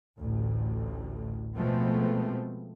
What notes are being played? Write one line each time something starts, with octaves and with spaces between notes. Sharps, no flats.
A1 D2 A2
B2 F3 G#3 A3 B3 C4